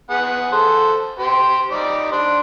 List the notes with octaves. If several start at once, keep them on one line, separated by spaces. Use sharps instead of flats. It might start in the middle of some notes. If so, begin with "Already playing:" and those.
B3 G#4 F#5
A4 C5
G4 C5
G3 D#4 D5
D4 C5